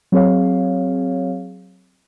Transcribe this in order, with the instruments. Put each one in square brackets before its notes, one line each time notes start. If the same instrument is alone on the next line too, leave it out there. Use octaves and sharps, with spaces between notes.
[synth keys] F#3 C4 G#4 C#5 F5